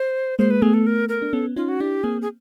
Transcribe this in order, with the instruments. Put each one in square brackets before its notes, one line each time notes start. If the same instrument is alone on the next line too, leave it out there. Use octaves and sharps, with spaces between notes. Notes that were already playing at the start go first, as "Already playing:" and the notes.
Already playing: [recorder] C5
[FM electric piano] G#3 A#3 [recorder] C5
[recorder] B4
[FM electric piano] A3 B3 [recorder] G#4
[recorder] A4
A#4
A#4
[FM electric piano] D4
[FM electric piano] B3 C#4 [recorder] A4
[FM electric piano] C#4 D#4 [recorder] F4
[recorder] F#4
[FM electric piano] D4 E4 [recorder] G4
[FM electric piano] A#3 C4 [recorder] G#4
[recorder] G#4